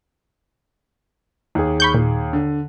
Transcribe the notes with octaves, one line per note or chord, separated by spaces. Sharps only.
D#2 G#4
B5 C#6 G6
A#2
D3